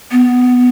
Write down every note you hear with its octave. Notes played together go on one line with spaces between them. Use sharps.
B3